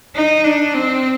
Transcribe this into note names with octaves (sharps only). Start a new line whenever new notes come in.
D#4
D4
C4